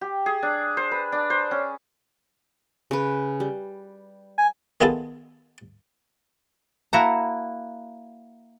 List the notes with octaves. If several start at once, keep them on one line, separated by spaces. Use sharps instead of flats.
G4
G#4
D4
C5
B4
D4
C5
C#4
C#3 B4
G3
G#5
D#3 B3 E4 F4 G#4 A4
A#3 E4 F#4 F#5 A5 A#5